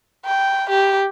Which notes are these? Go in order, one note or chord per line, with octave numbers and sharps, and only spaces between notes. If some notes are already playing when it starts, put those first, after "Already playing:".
G5
G4